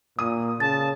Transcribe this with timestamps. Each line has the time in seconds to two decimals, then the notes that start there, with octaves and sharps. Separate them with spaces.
0.19 A#2 D#6
0.60 C#3 A5 A6